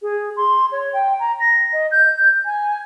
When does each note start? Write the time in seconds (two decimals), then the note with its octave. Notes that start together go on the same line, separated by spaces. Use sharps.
0.02 G#4
0.37 C6
0.72 C#5
0.93 G5
1.20 A#5
1.40 A#6
1.73 D#5
1.91 G6
2.45 G#5